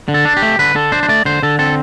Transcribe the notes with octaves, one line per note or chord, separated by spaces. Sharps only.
D3
A4
D4
G4
A3
D3 B4
D3 A4
D4 C5
C5
A3 D5
D3 C5
D3 A4
C4 A4